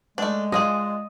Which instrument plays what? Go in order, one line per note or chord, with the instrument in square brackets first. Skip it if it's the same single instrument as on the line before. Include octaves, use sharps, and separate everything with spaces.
[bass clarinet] G#3 [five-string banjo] A3 D4
[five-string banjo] D4 F4 G#4 [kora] D#5